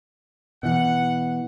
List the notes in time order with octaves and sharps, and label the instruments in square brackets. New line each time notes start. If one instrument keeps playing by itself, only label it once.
[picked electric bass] B2 E3 [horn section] F#5